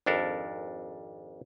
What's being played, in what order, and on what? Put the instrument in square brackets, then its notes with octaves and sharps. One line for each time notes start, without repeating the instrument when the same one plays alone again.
[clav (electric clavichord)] G#1 F2 D4 A4 A#4